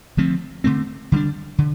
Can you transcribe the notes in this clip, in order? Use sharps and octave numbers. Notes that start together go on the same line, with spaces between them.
D3 F3 A3 C4
D3 F3 A3 C4
D3 G3 D4
D3